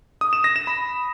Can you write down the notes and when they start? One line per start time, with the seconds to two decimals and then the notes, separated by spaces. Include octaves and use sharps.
0.21 D#6
0.33 E7
0.44 A#6
0.56 E7
0.67 B5